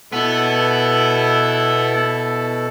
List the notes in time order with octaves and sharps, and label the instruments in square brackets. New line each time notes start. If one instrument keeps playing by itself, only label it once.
[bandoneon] B2 A4 [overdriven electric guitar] B3 [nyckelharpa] E4